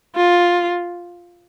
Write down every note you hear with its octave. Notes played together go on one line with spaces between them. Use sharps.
F4